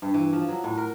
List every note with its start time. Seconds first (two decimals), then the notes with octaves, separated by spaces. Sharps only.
0.02 G2
0.14 E3
0.33 F3
0.49 F#3
0.64 A2
0.77 A#4